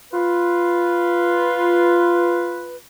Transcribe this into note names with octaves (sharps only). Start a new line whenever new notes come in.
F4 B4